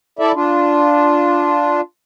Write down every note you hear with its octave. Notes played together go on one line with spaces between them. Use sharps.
E4 A4 D5 E5
D4 F4